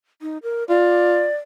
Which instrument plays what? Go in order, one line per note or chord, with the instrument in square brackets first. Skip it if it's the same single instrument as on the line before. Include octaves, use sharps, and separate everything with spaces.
[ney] D#4
A#4
[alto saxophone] F4 [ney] D5